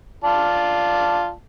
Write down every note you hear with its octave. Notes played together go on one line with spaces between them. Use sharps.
F4 D5 A5